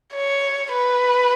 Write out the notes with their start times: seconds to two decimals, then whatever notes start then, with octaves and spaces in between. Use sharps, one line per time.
0.15 C#5
0.73 B4